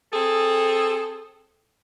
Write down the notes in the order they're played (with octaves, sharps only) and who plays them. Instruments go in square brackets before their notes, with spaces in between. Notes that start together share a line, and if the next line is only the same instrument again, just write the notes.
[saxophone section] C4 G#4 A4